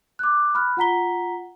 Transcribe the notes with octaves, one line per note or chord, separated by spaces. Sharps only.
D6 F#6
B5 F6 F#6
F4 F#5 A#5 B6 G7